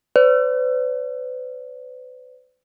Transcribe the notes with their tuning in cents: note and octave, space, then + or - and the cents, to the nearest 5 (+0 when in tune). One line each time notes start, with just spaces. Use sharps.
B4 +40 D5 -45